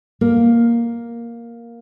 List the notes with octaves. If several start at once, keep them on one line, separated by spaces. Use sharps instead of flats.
A#3